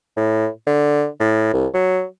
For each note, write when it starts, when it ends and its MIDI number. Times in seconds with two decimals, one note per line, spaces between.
0.17 0.48 45
0.67 1.07 50
1.20 1.51 45
1.53 1.67 36
1.74 2.04 54